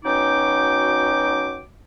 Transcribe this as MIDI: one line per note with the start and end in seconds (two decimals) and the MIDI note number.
0.05 1.61 47
0.05 1.61 54
0.05 1.61 61
0.05 1.61 63
0.05 1.61 79
0.05 1.61 86